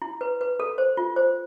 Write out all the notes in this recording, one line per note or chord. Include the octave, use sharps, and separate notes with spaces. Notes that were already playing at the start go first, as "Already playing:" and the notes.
E4
B4
B4
A4
C5
F4
C5